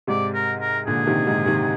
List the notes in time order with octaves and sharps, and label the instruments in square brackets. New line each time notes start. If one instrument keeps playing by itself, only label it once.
[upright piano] G#2 C3 [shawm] D5
[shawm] A#4
A#4
[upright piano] A#2 D3 [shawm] G#4
[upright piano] C3 D#3
G#2 C3
C3 D#3